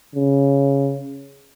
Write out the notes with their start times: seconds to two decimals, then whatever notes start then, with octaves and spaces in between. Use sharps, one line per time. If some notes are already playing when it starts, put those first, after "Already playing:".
0.15 C#3